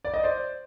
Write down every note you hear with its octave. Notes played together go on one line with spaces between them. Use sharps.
D5
D#5
C5 D5